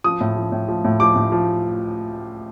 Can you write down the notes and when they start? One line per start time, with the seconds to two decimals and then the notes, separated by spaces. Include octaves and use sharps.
0.04 F3 D#6
0.21 A2
0.36 F3
0.52 A2
0.68 F3
0.85 A2
1.00 F3 D6
1.16 A2
1.32 F3